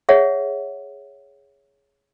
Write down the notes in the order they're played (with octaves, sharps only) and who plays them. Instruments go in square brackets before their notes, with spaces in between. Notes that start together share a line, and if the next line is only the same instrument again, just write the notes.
[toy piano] G#4 C#5 E5 F#5